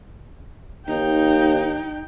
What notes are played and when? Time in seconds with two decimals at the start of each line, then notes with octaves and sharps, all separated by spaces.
0.88 D#2 D#4 G5